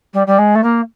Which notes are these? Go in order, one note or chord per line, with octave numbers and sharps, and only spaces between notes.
G3
G3
G#3
A3
A#3